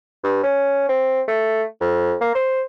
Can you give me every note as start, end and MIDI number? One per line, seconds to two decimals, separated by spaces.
0.23 0.42 43
0.43 0.84 61
0.88 1.21 60
1.28 1.63 57
1.81 2.15 41
2.21 2.34 58
2.35 2.62 72